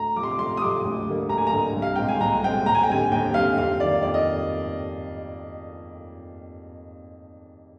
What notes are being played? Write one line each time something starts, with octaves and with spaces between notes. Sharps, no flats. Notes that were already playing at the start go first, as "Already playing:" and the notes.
Already playing: D2 A#5
C3 F3 C6 D6
D6
D2 C6
D#6
C3 F3 D6
D2
D3 G3 A#3
D2 A#5
G#5
A#5
D3 G3 A#3
C2
F5
A#2 G#3 C4 G5
G#5
C2 A#5
A#2 G#3 C4 G5
D#2 A#5
G#5
G5
D3 G3 C4 G#5
D#2 G5
D3 G3 C4 F5
F2 F5
D#3 G3 A#3 D5
F2 D5
D#5